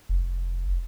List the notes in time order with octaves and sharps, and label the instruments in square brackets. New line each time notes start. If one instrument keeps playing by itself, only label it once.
[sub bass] F1